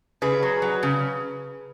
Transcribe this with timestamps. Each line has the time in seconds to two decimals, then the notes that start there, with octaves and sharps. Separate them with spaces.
0.22 C#3 G#4 B4
0.43 F#3
0.62 F#3
0.83 C#3